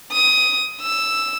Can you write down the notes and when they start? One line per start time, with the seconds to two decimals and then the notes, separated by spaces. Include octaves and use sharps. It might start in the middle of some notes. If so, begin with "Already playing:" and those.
0.12 D#6
0.81 E6